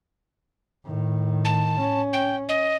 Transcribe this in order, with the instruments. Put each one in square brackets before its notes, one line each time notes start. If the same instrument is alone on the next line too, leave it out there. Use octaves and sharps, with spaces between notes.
[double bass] A2 D#3
[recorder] A5
[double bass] C#4
[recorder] G5
D#5